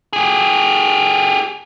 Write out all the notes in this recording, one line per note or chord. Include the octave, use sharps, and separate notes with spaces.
G4 G#4